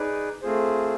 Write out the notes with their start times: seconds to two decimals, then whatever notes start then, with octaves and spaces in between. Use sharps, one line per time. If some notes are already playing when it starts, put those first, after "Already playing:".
Already playing: D#4 G#4 B4 D5
0.42 A3 C4 F4 G#4 C5